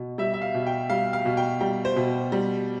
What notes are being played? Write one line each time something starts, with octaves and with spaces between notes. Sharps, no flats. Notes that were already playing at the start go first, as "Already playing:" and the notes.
Already playing: B2
G3 E5
E5
F5
B2
G5
G3 F5
F5
B2
G5
G3 G5
C5
B2
G3